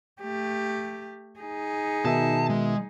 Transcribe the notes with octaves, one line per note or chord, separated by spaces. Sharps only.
A3 G4
D#4 G#4
B2 D#3 E5 A5
G#3